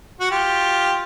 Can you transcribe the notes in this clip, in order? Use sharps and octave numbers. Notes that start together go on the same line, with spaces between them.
F#4
F4 G4